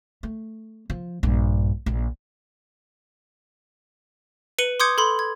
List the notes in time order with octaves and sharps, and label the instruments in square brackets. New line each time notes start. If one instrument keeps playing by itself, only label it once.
[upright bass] A3
F3
A#1 G2
A#1
[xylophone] B4 C#7 D#7 F#7 G7
C6 D6 D#6 G6 G#6 C#7
A4 B5 C6
G#6